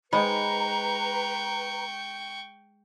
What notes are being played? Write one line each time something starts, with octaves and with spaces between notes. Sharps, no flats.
G#3 D#4 B4 C5 G5 A#5 B5 C#6